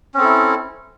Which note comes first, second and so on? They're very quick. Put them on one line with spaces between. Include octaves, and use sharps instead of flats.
C#4 C4 A4 E4